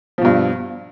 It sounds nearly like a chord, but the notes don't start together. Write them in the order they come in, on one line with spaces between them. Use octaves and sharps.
F3 B2 G2